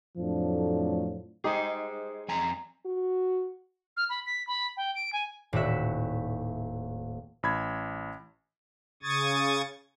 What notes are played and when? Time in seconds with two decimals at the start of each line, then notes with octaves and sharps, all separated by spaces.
0.18 F2 A2 F3 F#3 A3 D4
1.44 G#3 D#4 G4 G#4 C5
2.28 F2 G#5 A#5
2.85 F#4
3.97 F6
4.10 B5
4.26 B6
4.47 B5
4.77 G5
4.95 D7
5.13 G#5
5.53 D#1 A2 F#4 E5
7.43 A1 B5 G#6
9.03 C#3 C#6 D#6 G#6 A6